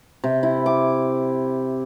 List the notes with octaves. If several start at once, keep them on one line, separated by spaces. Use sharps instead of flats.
C3
E4
D6